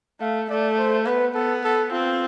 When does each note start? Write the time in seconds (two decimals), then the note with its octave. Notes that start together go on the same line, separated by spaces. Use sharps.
0.21 A3 F5
0.50 A3 D5
0.78 C5
1.06 B3 B4
1.34 B3 A4
1.64 A4
1.92 C4 F4